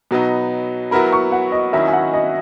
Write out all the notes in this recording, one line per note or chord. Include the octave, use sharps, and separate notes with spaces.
B2 F#3 B3 D#4
F#3 B3 E4 A#4 B5
C#6
F#5
D#5
D#3 F#3 C#4 E4 E5
G#5
F#5
D#5